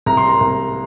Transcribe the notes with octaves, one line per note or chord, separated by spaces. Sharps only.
C2 A#5
C6
A#5
C2